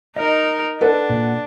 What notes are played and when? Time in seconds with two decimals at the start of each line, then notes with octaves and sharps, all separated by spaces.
0.16 D#4 A#4 D#5
0.81 D4 A4 B4 F#5
1.10 A#2